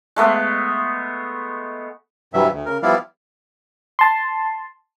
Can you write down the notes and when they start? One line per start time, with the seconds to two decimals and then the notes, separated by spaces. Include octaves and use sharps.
0.16 G#3 A3 B3
2.34 G2 C3 E3 F#3 G3 E5
2.52 D2
2.66 C#3 A#4
2.83 F3 G3 B3 E4 D5 F5
3.99 A5 C6